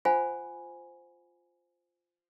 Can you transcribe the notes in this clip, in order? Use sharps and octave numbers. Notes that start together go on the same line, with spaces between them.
F4 C5 F#5 G#5 B5